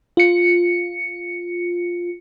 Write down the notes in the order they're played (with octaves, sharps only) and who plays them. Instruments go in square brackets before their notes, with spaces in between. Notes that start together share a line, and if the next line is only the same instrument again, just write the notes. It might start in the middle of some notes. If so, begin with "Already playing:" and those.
[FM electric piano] F4 C#7